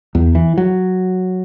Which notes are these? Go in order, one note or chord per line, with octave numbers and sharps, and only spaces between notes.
E2
E3
F#3